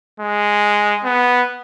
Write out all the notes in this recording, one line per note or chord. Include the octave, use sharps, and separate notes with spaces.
G#3
B3